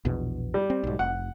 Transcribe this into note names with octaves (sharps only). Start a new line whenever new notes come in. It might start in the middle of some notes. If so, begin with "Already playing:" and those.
A#1 E2 B2
G3
C4
B1 G#2
F1 F#5